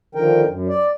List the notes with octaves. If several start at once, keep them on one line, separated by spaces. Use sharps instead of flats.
D3 D#3 F3 A#4 G5
F#2
D5